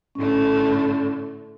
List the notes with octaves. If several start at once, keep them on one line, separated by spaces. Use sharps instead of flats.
A2 D3 A3 C#4